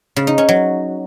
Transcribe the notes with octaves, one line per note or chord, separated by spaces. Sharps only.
C#3
D#4
C#4
F#3